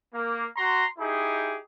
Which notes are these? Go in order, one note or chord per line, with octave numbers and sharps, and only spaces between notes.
A#3
F#4 A#5 C6
D#4 E4 G4 G#4